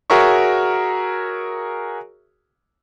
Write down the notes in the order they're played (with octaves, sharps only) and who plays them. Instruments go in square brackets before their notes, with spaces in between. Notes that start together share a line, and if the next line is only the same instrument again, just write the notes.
[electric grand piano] F#4 G#4 A#4 C#5 E5 C#6